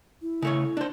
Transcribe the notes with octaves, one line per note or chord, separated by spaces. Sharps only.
E4
C#3 A3 C#5
D4 C5